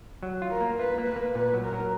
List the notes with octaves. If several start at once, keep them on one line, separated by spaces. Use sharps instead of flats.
F#3
F4
A#4
A#3
F4 B4
A#3
B4
A#3
A#2 B4
F#3
A#4
F#3